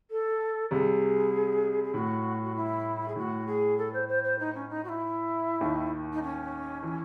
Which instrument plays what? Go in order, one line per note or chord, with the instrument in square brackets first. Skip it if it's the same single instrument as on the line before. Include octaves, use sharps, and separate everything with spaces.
[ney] A4
[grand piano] C2 C3 [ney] G#4
[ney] G#4
[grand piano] A2 [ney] F#4
[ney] F#4
E4
G#4
[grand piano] A2 [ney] F#4
[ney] G#4
A4
C5
C5
C5
D#4
C#4
D#4
F#4
E4
[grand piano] D#2 D#3
[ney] D#4
C#4
[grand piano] E3